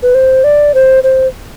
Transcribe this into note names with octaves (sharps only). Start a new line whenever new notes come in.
B4
C5
D5
C5
C5